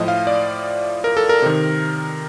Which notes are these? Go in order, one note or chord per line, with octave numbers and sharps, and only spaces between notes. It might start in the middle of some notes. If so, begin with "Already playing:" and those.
Already playing: A2 F3 D#5
F5
D5
A#4
A4
A#4
C3 D#3